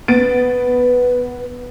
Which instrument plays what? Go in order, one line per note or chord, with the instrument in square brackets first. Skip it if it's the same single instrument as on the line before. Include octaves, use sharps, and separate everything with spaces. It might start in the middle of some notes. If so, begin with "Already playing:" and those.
[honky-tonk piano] B3 A6 D7 [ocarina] B4